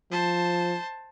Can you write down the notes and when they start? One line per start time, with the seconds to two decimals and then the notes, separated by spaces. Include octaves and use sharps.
0.12 F3 C5 A5